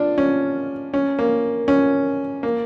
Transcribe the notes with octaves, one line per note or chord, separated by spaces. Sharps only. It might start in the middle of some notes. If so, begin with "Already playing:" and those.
Already playing: D4 F4
C#4
C#4
A#3
C#4
A#3